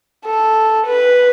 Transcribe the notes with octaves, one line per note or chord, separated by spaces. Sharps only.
A4
B4